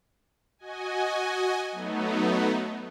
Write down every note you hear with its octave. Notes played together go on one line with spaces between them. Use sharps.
F#4 D#5 G#5
F#3 A3 B3 D#4